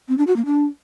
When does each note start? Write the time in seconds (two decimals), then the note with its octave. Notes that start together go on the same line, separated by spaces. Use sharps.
0.09 C4
0.18 D4
0.27 F#4
0.36 A#3
0.46 D4